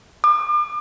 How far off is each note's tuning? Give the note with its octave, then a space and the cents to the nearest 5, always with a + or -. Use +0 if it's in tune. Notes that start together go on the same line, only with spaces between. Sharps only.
D6 +40